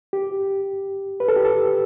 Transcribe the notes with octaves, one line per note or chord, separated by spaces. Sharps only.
G4
B4
A4
G4
A4